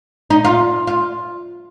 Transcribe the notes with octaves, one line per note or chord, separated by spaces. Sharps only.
D#4
F4
F4